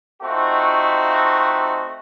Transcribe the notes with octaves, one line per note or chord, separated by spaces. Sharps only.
A3 C4 D#4 F4 F#4